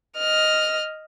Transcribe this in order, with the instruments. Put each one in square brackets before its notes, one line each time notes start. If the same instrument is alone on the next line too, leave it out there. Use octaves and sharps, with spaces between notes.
[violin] D#5 F6